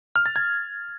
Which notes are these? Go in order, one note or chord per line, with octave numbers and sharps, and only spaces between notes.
F6
A6
G#6